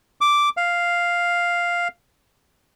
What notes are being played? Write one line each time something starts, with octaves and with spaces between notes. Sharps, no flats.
D6
F5